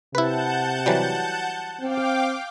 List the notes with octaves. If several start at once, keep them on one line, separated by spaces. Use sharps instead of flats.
C3 E4 B4 F#5 A5 G6
E3 F#3 G3
C4 F5 G5 D6